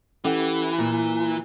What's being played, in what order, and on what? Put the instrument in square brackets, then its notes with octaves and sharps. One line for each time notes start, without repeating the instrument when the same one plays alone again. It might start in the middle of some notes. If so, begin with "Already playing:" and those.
[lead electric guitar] E3 [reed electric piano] C#4 A4 F#5 [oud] G4
[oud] A#2 [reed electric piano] A#3 F4